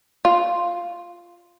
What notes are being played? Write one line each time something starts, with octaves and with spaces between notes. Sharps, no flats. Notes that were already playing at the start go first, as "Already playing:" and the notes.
F4